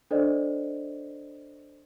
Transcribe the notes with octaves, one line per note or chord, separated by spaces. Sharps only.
D4 A4 C5 D5 D#5